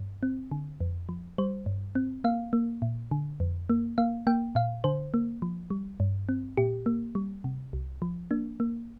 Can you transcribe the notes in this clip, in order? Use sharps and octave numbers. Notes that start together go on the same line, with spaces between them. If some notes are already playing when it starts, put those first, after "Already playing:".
Already playing: G2
C4
D3
F2
F3
G3 C5
G2
C4
A#3 F5
A#3
A#2
D3
F2
A#3
A#3 F5
A#3 G5
A#2 F5
D3 C5
A#3
F3
G3
G2
C4
A#2 G4
A#3
G3
C3
C2
F3
A#3 D4
A#3